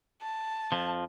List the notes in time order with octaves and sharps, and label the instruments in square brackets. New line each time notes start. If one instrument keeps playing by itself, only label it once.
[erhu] A5
[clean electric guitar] F2 F3